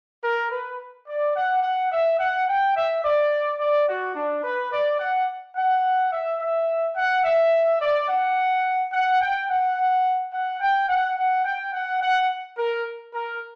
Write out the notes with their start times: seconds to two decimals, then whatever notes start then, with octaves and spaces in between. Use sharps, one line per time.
0.23 A#4
0.51 B4
1.08 D5
1.35 F#5
1.63 F#5
1.91 E5
2.20 F#5
2.48 G5
2.76 E5
3.04 D5
3.59 D5
3.88 F#4
4.16 D4
4.44 B4
4.72 D5
5.00 F#5
5.56 F#5
6.12 E5
6.40 E5
6.96 F#5
7.24 E5
7.80 D5
8.08 F#5
8.93 F#5
9.21 G5
9.49 F#5
10.33 F#5
10.61 G5
10.89 F#5
11.17 F#5
11.45 G5
11.73 F#5
12.01 F#5
12.57 A#4
13.14 A#4